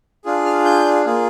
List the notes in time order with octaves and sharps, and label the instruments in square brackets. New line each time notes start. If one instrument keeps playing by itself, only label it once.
[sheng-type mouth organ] D4 F4 G#4
F6
G6
A#3 F4 G#4